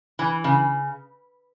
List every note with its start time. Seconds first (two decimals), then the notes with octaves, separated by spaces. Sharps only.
0.19 E3
0.44 C#3